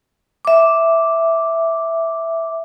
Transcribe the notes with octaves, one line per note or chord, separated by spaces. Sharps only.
E5 D6